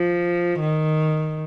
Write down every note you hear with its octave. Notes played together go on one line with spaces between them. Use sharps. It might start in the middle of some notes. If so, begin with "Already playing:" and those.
Already playing: F3
D#3